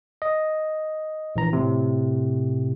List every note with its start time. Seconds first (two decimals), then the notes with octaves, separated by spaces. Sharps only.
0.22 D#5
1.36 A#1 E3 A#5
1.53 A2 C3